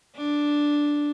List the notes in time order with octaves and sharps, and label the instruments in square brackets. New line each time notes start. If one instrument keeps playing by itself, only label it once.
[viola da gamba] D4